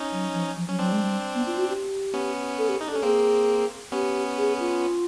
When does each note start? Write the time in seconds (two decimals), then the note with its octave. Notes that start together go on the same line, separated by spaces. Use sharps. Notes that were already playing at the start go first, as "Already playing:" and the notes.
Already playing: C#4 D#4
0.12 F#3
0.34 F3
0.57 F3
0.68 F#3 C#4
0.79 F#3 C4 D4
0.92 G#3
1.01 G3
1.35 B3
1.47 F4
1.58 F#4
1.69 G4
2.14 B3 C#4
2.58 A4
2.69 G4
2.81 D#4
2.88 D4
2.91 A4
2.95 C#4
3.02 A#3 C4 G#4
3.92 B3 C#4 G4
4.37 G#4
4.60 F4